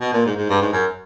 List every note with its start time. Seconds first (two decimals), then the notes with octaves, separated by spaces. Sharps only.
0.01 B2
0.13 A#2
0.26 G#2
0.37 G#2
0.50 G2
0.62 G#2
0.73 F#2